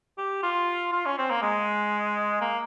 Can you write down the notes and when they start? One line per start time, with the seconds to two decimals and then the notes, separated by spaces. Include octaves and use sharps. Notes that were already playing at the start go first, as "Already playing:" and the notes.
0.18 G4
0.43 F4
0.92 F4
1.05 C#4
1.18 C4
1.30 A#3
1.42 G#3
2.41 A#3